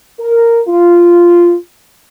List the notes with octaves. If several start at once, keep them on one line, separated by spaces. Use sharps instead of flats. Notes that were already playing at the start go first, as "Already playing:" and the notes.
A#4
F4